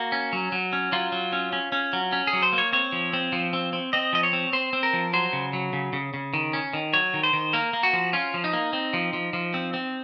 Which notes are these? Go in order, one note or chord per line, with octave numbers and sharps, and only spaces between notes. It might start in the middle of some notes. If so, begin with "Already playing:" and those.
Already playing: A#3 F#4
C#4
F#3
F#3
C#4
F#3 F4
F#3
C#4
C#4
C#4
F#3
C#4
G#4
F#3
C5
A#3
C#5
C4 C#5
F3
C4
F3
C4
C4
C4 D#5
F3 D#5
C#5
C4
C4 C5
C4
A#4
F3
F#3 C5
C#3
F#3
C#3
C#3
C#3
D#3
C#4
D#3
F#3 C#5
D#3
C5
D#3
A#3 A#4
A#3
F#4
F3
C#4 F4
F3
D#4
A#3
C4
F3
F3
F3
C4
C4